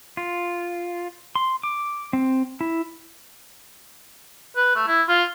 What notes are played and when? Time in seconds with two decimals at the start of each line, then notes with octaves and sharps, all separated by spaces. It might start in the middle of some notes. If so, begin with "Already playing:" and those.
0.17 F4
1.35 C6
1.63 D6
2.13 C4
2.61 E4
4.56 B4
4.76 A3
4.87 E4
5.08 F4